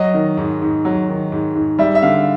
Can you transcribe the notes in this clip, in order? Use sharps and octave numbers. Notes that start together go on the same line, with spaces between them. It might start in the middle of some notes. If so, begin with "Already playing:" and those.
Already playing: F#3 D#5
D#3
G#2
G#2
F#3
D#3
G#2
G#2
G3 E5
E5
D3 F5